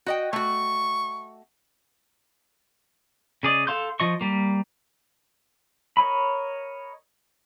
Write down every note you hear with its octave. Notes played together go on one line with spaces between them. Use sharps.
F#4 D#5 G5
A3 F#4 C#6
C#3 G#4 D5 D#5
A4 F5 C6 G6
F3 D#5 C#6
G3 A#3
A#4 C#5 D#5 B5